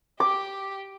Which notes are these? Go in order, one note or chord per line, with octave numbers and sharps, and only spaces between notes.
G4 D6